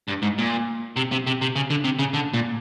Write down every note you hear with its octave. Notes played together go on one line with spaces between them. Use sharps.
G2
G#2
A#2
C3
C3
C3
C3
C#3
D3
C3
C#3
D3
A#2